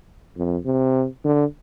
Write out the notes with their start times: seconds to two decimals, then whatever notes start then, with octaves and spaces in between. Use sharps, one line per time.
0.37 F2
0.65 C3
1.24 D3